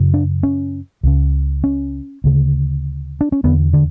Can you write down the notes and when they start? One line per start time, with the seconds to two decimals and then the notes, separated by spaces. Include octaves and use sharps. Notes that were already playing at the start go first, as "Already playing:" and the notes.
Already playing: F#2 C#3
0.14 D4
0.43 C#4
1.03 C#2 C#3
1.64 C#4
2.24 D2 C#3
3.21 D4
3.32 C#4
3.44 E2 D3 B3
3.73 D3